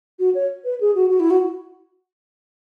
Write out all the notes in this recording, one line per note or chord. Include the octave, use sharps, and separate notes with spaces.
F#4
C#5
B4
G#4
F#4
F#4
E4
F#4